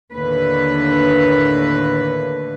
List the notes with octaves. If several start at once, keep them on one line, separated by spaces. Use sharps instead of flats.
D#2 A2 D3 B4